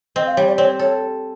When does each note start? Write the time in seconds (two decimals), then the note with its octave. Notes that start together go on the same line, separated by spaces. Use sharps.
0.16 C4 D#5
0.26 F5
0.37 G3 C#5
0.47 D5
0.58 C4 C#5
0.79 A4 C#5